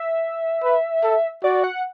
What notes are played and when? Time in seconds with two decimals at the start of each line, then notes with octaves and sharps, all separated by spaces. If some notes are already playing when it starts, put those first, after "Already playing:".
Already playing: E5
0.63 B4
1.03 A4
1.43 F#4 D5
1.64 F#5